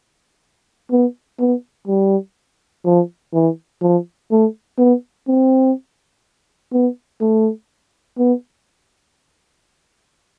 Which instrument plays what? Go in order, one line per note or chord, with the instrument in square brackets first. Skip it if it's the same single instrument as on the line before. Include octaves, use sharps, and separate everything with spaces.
[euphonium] B3
B3
G3
F3
E3
F3
A3
B3
C4
B3
A3
B3